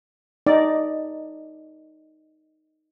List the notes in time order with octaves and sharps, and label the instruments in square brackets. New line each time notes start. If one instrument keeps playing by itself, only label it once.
[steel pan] D#4 D5